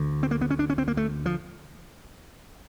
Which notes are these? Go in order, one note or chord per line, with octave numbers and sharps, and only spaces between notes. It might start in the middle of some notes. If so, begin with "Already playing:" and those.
Already playing: D2 D3
C4
A#3
B3
C#4
D4
C#4
C4
A#3
A3
F3